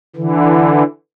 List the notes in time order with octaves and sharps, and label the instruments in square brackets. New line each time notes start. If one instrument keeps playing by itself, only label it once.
[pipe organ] D3 E3